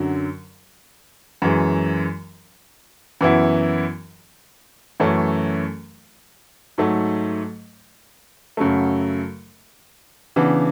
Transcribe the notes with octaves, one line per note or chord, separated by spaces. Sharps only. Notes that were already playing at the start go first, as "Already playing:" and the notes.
Already playing: F#2 D3 F#3
F#2 E3 G#3
F#2 E3 B3 E4
F#2 E3 A3 C#4
G#2 F#3 A3
F#2 C#3 F#3 A3
C#3 E3 B3 D4